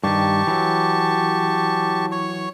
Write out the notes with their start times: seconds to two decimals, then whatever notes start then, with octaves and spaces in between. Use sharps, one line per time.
0.04 G2 D#3 G4 A5 C#6
0.47 E3 F#3
2.12 C#5 C#6